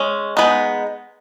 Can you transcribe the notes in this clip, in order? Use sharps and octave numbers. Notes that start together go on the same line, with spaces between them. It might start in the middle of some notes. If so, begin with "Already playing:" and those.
Already playing: G#3 C#4
G#3 B3 D#4